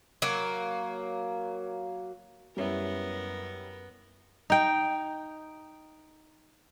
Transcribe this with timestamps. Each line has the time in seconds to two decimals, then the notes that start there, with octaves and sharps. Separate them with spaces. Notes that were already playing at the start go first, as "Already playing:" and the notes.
0.22 F#3 A#3
2.57 F#2 G3 B3 C#4 E4 A#4
4.50 D#4 G5